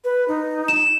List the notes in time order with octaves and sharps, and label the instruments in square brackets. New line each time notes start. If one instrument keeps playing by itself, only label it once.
[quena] B4
D#4
[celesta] E7